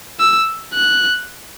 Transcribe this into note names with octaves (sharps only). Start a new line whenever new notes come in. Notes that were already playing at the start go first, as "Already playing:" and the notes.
E6
F#6